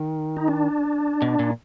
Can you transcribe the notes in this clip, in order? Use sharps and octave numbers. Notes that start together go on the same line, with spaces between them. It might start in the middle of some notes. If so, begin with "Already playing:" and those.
Already playing: D#3
D#4
D4
B2
A#2